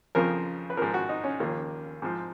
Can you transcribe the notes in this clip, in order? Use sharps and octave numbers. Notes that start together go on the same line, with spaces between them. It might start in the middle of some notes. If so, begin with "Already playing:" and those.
F2 C#3 F3 A#4
B4
G#2 F3 A#4
F#4
D#4
C#4
D#2 C#3 F3 A#3
G#2 F3